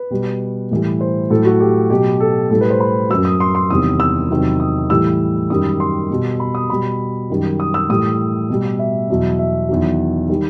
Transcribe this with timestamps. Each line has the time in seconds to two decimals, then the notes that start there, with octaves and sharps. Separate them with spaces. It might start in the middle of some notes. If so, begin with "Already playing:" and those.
Already playing: B4
0.10 B2 G3
0.71 A2 E3 G3
1.01 C5
1.30 A2 F#3 A4
1.45 F#4
1.60 G4
1.90 B2 F#3 G4
2.20 A4
2.50 A2 G3 A4
2.61 B4
2.70 C5
2.80 B5
3.10 F#2 F#3 E6
3.25 D#6
3.40 C6
3.55 C6
3.70 E2 C3 D#3 G3 D#6
4.00 E6
4.30 E2 C3 D#3 F#3
4.60 D#6
4.90 A2 E3 G3 E6
5.50 F#2 D#3 G3 D#6
5.80 C6
6.10 B2 G3
6.40 B5
6.55 D#6
6.70 B2 G3 B5
7.30 F#2 D#3 G3
7.60 D#6
7.74 E6
7.89 A2 E3 G3 D#6
8.49 B2 G3
8.79 E5
9.10 E2 B2 F#3
9.39 E5
9.69 E2 D#3 F#3
10.29 D#3 G3